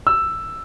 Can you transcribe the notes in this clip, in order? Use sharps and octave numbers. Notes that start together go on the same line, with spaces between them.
E6